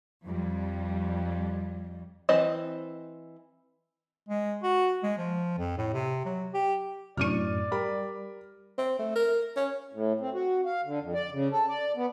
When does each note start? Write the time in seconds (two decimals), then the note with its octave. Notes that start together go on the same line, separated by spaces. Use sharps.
0.24 F2 G3
2.29 E3 C4 C5 D#5
4.29 G#3
4.63 F#4
5.03 G#3
5.18 F3
5.58 F2
5.78 A2
5.93 C3
6.25 F#3
6.54 G4
7.17 F#2 A2 C3 D4 D5 C#6 F6 D#7
7.72 G3 A#4 B5
8.78 C4
8.99 A3
9.15 A#4
9.56 C#4
9.93 A2
10.20 C4
10.34 F#4
10.65 F5
10.85 D3
11.00 F2
11.14 D5
11.32 C#3
11.52 A4
11.69 D5
11.96 B3